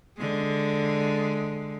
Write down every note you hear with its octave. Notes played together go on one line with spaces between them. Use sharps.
D3 G#3